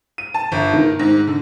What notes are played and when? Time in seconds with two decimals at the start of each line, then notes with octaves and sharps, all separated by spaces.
0.18 D#7
0.34 A5
0.52 G1
0.73 D#3
0.99 G#2
1.27 D3